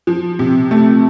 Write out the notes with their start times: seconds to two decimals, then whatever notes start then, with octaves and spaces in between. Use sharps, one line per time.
0.07 F3
0.39 C3
0.71 A3